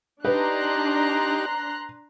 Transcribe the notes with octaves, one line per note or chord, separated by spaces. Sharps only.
D4 D#4 G4 B4 A#5 C6 F#6